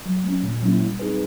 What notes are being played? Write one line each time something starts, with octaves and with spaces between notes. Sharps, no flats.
F#3
A3 C#4
A#2
F#3 A#3 C#4 E4
G3
C4 D#4 G#4 B4